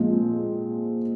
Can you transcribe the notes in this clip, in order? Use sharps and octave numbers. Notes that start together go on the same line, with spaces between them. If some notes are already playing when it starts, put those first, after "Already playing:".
Already playing: A#2 F3 G#3 C4